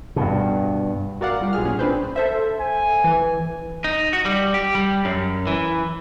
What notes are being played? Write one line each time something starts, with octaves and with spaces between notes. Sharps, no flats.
G2 B2
F#4 A#4 D5 F5 F#5
G3 F4 G4
B1 G#3 G#4 F6
A#2 C#4 G#4
C4 D4 B4 C5
A4 C5 E5
G#5
E3
D#4
F#4
G3
G4
G3
F#2
E3